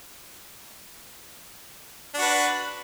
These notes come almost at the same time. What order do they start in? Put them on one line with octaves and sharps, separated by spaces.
D4 F#4 B4